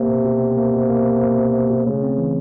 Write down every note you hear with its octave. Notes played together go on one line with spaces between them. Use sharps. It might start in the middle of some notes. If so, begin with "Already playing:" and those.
Already playing: C3 A#3
B2
B2
B2
A#3
B2
A#3
A#3
A#3
B2
B2
B2
C#3 A3
C4
E3